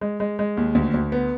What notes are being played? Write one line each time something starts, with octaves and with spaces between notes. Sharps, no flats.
G#3
G#3
G#3
D#2
D2
D2
B3